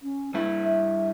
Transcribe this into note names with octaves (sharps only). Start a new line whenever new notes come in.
C#4
G2 E4 B4
E5